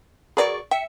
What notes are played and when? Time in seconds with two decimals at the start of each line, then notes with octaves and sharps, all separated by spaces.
0.37 F#3 G#4 A#4 B4 D5 C#6
0.71 E5 G5 C#7